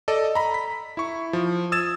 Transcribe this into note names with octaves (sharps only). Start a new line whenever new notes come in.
A4 D5 D#5
A#5 B5
B6
E4 C#6
F3
D#6 E6 G#6 A6 E7